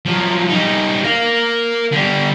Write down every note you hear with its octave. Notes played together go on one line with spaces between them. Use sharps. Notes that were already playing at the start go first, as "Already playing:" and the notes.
F3 F#3
G3 D#4
A#4 F5
D3 G3